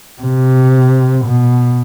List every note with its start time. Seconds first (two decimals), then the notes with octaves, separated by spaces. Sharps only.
0.21 C3
1.25 B2